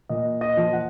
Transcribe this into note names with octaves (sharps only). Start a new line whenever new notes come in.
A#2 D#5
D#5
F3
F#5